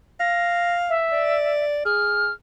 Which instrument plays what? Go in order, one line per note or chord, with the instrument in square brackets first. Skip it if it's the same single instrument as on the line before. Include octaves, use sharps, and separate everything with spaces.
[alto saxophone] F5 [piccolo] A#6
[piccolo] E5
[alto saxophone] D5
[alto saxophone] G#4 [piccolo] F6